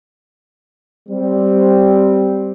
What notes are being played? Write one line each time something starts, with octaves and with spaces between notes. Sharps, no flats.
G3 C4